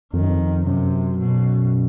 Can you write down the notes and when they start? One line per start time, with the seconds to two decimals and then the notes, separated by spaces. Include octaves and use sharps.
0.13 F2 D#3
0.21 F#2
0.29 F2
0.66 F#2 C3
1.19 B2